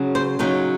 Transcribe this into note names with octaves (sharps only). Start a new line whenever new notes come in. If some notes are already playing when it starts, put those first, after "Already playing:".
Already playing: C#3 F#3 C#4
C5
C#3 F#3 C#4 D#4